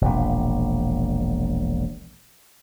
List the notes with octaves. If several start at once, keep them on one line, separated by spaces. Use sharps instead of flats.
E1 A#1